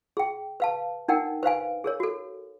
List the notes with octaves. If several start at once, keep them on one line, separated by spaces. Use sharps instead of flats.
G#4 G5
B4 F5 A5
D4 D#4 A#4 F#5 G5
B4 C5 F5 G#5
G#4 A#4 C#5
F#4 A4